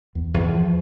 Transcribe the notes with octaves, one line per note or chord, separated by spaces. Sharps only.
E2
E2
F3